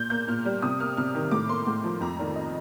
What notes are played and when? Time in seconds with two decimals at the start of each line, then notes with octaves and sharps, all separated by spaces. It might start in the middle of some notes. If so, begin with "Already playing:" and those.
Already playing: A#2 G6
0.10 A#3 G6
0.27 A#2 F6
0.45 G3
0.62 C3 D#6
0.80 A#3 F6
0.97 C3 F6
1.15 D#3
1.31 A2 D6
1.49 A#3 C6
1.67 A2
1.84 F3
2.01 F2 A#5
2.19 D#3 D5
2.36 D#5